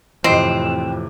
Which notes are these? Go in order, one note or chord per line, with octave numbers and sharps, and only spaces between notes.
F2 A2 C3 E3 C4 D#5 C7